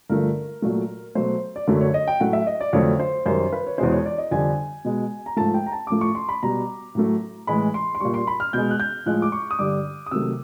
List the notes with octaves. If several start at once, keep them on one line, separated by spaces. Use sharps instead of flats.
G2 D3 F3 A3 A#4
A#2 F#3 A3
B2 F#3 A3 C5
D5
F#2 D3 F#3 A3 C#5
C#5
D#5
G5
A2 F#3 A3 F#5
E5
D#5
D5
F2 D3 F#3 A3 C#5
C5
F#2 D#3 G3 C5
B4
C#5
E2 B2 G#3 C5
C#5
D5
D#5
F2 D3 G3 G#5
B2 G#3
A#5
G#2 F3 A3 A5
G5
A#5
A5
A2 F3 A3 D6
C#6
C6
B5
B2 G3 A#5
A2 F#3 A3
A2 E3 G#3 B5
C6
C6
A#2 G3 C#6
C6
B5
F6
B2 G#3 G6
F#6
G6
A2 F3 G#3 F#6
D6
C#6
D#6
G2 D3 G3 D6
D#6
C3 D#3 F#3 A3 E6